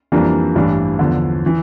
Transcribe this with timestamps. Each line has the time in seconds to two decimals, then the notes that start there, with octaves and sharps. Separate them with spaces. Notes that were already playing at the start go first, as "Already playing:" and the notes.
0.12 F2 E3 G3 A#3 D4
0.55 A1 G2 E3 G3 D4
0.99 E2 D3 F3
1.46 E3